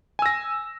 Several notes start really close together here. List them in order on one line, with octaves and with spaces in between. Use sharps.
G#5 E6 A#6